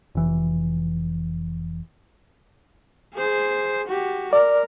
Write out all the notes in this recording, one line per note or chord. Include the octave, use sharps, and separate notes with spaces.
F1 E3
G#4 C5
F#4 G4
A#4 D5